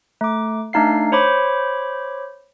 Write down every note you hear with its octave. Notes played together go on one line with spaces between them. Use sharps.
A3 D6
A3 D4 D#4 F5 C7
C5 C#5 B5 D6